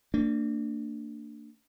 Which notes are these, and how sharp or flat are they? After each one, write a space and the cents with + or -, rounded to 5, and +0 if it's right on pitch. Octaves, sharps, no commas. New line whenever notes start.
A#3 -40 D4 +0